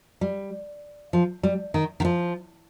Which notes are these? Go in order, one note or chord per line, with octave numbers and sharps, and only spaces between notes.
G3
F3
G3
D#3
D#3
F3